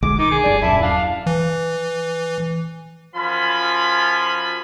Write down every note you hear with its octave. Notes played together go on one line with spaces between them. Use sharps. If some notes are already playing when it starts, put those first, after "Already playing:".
B1 D3 G#3 D6
D#3 D#4 D6
G#4
F1 G2 D5
D#1 F#2 E4 A5
D4 F5
E3
F#2 F3 F4 G#5 B5